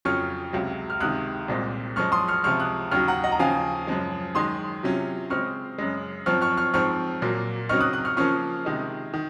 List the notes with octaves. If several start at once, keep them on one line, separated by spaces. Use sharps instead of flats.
F2 C#3 F#3 C#4 F4 C#6 F6
C#2 C3 F#3
F6
C#2 C3 D#3 D#6 F#6
C2 A#2 G#3 C4
F#2 F3 G#3 C#6 F6
C6 D#6
C#6 F6
C#2 C3 F3 C#6 F6
D#6 F#6
D#2 C#3 F#3 C#6 F6
F#5 A#5
D#5 F#5
A#5
D#2 C#3 F3 F5 G#5
F#2 C#3 F3 G#3
F#2 D#3 G#3 C6 D#6
C3 F#3 C#4 F4
C#3 G#3 C4 C#6 F6
F#2 C#3 G#3
F#2 F3 C4 F4 C#6 F6
C#6 F6
C#6 F6
G#2 F3 C4 C#6 F6
A#2 F#3 A#3
C#3 F#3 C4 D#4 C#6 F6
D#6 F#6
D#6 F#6
C#6 F6
C#3 F3 A#3 C#4 F4 C#6 F6
C3 D#3 G#3 D#4
D#3